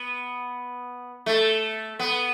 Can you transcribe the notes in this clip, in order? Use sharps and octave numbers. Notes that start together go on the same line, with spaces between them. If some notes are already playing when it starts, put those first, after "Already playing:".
Already playing: B3
A3
B3